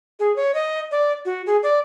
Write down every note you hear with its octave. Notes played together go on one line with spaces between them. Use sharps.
G#4
C#5
D#5
D5
F#4
G#4
D5